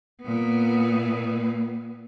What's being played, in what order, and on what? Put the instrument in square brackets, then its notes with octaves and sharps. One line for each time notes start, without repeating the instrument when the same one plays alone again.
[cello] A#2 B3